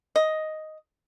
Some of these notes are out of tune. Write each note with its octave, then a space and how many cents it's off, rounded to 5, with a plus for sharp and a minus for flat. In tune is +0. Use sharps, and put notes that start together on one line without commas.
D#5 +5